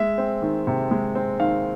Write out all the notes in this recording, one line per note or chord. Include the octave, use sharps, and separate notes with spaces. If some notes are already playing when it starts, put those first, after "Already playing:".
Already playing: G#3 E5
C4
D#3
C3
G#3
C4
D#3 F5